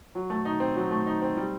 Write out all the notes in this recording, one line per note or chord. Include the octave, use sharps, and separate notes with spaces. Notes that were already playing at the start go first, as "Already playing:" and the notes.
F#3
A3
D#4
C4
F#3
A3
D#4
C4
G3